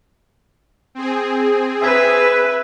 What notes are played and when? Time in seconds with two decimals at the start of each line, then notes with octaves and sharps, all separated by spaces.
0.95 C4 G#4
1.82 B4 E5 E6 G#6 B6